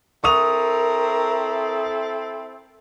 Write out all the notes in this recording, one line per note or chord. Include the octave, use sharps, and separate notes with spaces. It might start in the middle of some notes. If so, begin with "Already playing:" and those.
C4 E4 A4 A#4 C#6 D#6 F7